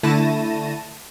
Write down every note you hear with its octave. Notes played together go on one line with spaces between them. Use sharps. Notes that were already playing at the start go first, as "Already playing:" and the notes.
D3 A3 E4 A5 A#6 D#7